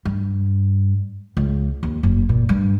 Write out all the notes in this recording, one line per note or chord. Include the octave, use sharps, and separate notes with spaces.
G2
C#2
D#2
F#1
A#2
G2